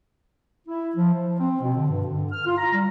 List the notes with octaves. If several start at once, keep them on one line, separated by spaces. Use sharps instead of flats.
E4
F3
F3
C4
B2
D3
G2
D3
F6
F4
A#5
G3